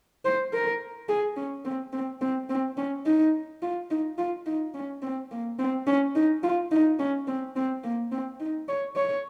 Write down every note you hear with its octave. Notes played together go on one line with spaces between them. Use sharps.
C5
A#4
G#4
C#4
C4
C4
C4
C4
C#4
D#4
F4
D#4
F4
D#4
C#4
C4
A#3
C4
C#4
D#4
F4
D#4
C#4
C4
C4
A#3
C4
D#4
C#5
C#5